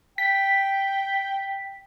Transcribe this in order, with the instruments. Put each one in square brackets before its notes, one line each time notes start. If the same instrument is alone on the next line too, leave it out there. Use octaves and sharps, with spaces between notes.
[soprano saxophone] G5 [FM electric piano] B6